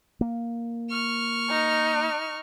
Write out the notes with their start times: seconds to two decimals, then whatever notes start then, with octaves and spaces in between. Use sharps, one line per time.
0.21 A#3
0.90 C#6 F6
1.50 D#4